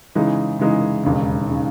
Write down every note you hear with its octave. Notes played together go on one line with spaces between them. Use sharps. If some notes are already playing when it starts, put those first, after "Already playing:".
C#3 E3 G#3 D#4
C#3 E3 G#3 D#4
E1 D#2 C#3
C#3